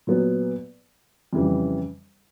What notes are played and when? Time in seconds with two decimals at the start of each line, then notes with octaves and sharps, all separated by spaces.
0.07 A#2 F#3 B3
1.33 F2 C#3 E3 G3